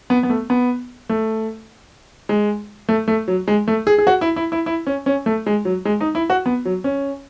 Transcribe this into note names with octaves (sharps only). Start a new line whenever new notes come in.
B3
B3
A3
B3
A3
G#3
A3
A3
F#3
G#3
A3
G#4
G#4
F#4
E4
E4
E4
E4
C#4
C#4
A3
G#3
F#3
G#3
D#4
E4
F#4
B3
F#3
C#4